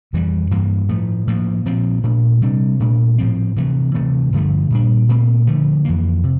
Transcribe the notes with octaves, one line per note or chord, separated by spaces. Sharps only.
F2 E3 G3
G2 E3 A#3
A2 F3 A3
A2 F3 A#3
A#2 F3 C4
A#2 A3 D4
C3 G3 D4
A#2 A3 D4
A2 F3 C4
C3 E3 A3
C3 E3 A3 C4
G2 D3 F3 A3
A#2 G3 D4
A#2 A3 C4
D3 F3 A3
F2 E3 A#3
C3